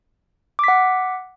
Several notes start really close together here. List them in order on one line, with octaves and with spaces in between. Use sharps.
D6 B6 F#5